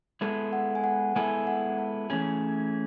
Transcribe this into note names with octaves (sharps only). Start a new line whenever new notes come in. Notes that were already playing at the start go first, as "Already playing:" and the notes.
G#3 B3 E4 A4
F#5
G#5
F#5
G#3 B3 E4 A4 G#5
F#5
A5
E3 A3 C#4 G#4